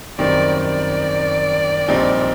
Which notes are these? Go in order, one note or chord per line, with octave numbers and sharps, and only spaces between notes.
F#2 D#3 G3 C4 D5
D5
A#1 A#2 G3 C4 D#4